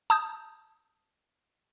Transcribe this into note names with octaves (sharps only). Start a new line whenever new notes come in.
A5 D#6 G6